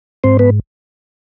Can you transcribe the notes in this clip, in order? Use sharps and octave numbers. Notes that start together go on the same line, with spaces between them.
G#2 C4 C5
B3 B4